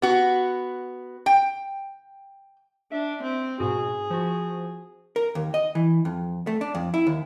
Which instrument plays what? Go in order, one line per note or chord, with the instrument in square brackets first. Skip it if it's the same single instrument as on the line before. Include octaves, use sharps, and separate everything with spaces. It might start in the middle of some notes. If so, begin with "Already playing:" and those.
[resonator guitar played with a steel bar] B3 F#4
G5
[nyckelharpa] D4 [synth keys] E5
[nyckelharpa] C4
[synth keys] G#2 B2 F#4 [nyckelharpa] G#4
[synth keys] F3 F#4
[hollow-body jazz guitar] A#4
D#2
D#5
E3
F2
A3
D4
F2
E4
D#2